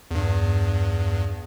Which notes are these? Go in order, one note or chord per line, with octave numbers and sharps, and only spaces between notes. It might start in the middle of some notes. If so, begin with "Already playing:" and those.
E2 G2